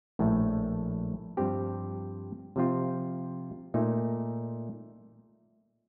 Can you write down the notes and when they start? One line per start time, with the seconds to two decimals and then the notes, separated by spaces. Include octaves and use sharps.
0.19 A#1 A2 A3
1.37 G2 F3 C4 G4
2.56 C3 F3 C4 F4
3.74 A#2 A3 D#4